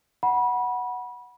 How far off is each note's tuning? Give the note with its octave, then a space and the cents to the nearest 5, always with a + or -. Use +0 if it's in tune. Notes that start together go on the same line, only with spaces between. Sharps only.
F#5 +0 B5 -25